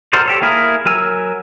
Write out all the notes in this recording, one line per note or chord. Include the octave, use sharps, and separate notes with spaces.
F#4 A4 A#4 C5 D5
G4 A4 C#5
A#3 E4 G#4 A#4
F#3 A#4 G#5 E6